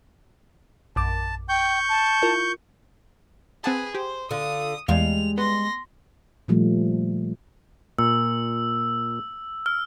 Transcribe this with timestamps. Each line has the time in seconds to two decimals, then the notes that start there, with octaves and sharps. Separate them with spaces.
0.96 A#1 F#2 A5 D6
1.49 G5 C#6 G6
1.89 A5
2.22 E4 F4 A#4
3.64 C4 G#4 B4 F#5 A5
3.95 G4 C5
4.31 D3 F4 D#6
4.88 E2 G3 G#3 F5 F7
5.38 B3 C6 A#6
6.48 A#2 D#3 F3 G3 A3
7.99 A#2 E6
9.66 F6